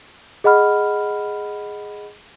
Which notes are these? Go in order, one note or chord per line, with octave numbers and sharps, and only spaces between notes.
G#4 D#5 F#5 B5 F6